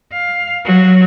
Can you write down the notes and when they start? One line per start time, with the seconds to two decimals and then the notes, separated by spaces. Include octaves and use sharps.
0.12 F5
0.65 F#3